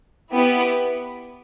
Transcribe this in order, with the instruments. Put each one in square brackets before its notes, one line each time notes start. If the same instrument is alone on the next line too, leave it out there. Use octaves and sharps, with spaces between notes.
[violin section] B3 E4 G4